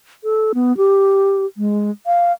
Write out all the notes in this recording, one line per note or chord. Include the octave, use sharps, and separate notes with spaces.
A4
B3
G4
G#3
F5